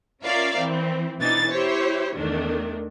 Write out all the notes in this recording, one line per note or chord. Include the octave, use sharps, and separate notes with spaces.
C#4 F4 A#4 D5 E5 F5
E3 C4
B2 E3 D4 D#4 A6
E4 G4 C5 C#5
E2 D#3 A3 D4